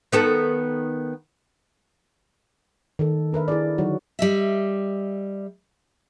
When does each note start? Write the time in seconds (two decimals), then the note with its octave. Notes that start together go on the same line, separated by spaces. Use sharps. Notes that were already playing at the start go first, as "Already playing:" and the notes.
0.12 D#3 B3 A4
2.99 D#3 A4
3.33 D4 A#4 B4 E5
3.48 E4 G#4 D5
3.78 D3 F#3 D#4 F#4
4.19 G3 D#5 E5